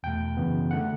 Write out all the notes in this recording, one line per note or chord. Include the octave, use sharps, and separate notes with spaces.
E2 B2 A3 G5
F#2 C#3 E3 B3
D3 A3 F#5